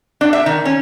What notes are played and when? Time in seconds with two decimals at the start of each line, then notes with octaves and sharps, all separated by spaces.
0.21 D4
0.33 E5
0.46 D#3
0.65 C#4